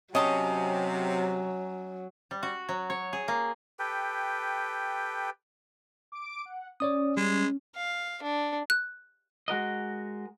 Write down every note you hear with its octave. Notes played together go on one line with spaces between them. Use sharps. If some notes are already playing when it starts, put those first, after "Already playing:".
C3 F#3 C#4 D#5 A5 A#5
G3
F#4
F#3
C#5
G#4
A#3
G4 A4 B4 G5
D6 D7
F#5
C#4 C#5 D5 D#6
G3 G#3
F5
D4
F#6
G#3 F#4 A#4 D#5